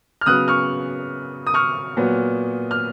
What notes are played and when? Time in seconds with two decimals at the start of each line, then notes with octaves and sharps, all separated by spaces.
0.21 F6
0.26 C#3 F#3 B3 D#6 F#6
0.48 C#6 F6
1.47 D#6
1.54 C#6 F6
1.97 A#2 F#3 B3
2.71 F6